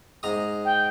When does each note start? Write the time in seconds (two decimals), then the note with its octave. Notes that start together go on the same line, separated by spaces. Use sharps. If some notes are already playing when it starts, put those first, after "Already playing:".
0.23 G#2 A#5 D#6
0.65 G5